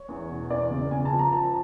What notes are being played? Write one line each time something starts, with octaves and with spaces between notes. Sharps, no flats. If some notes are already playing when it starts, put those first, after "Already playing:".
Already playing: C#5
E2
B2
E2 D5
C#3
C#3 G#5
A5
F3
A#5
F3 A5